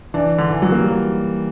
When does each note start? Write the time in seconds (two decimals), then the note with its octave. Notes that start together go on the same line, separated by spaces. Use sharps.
0.14 E3 D4
0.38 D3
0.51 E3
0.62 F#3
0.72 A#3
0.78 G3